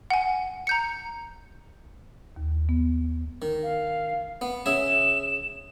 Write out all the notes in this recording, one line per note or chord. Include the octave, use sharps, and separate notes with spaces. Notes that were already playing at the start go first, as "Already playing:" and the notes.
F#5 G#5
A#5 G6 C#7
D#2
B3
D#3
F5
B3
C#3 G#4 E5 E7